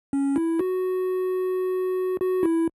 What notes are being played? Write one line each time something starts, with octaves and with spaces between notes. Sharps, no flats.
C#4
E4
F#4
F#4
E4